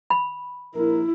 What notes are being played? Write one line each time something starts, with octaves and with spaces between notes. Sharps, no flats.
B5
A#1 E4 A#4